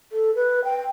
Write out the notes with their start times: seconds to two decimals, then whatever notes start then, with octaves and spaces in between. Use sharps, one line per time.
0.12 A4
0.36 B4
0.64 G5